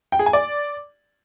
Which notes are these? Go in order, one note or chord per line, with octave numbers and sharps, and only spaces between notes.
G5
G#4
G#5
D5